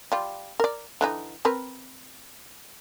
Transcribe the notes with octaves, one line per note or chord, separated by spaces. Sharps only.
G3 F4
A#4 D5
D3 E3 D#4
C4 A#4 B4